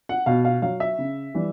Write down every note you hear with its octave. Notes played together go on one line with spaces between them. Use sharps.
F#5
B2 F5
F5
F#3 F5
E5
C#3
E3 G3